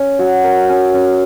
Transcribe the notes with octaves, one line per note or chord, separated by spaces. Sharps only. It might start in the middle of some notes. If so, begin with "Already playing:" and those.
Already playing: C#4
F#4
A#4
C#4
C#4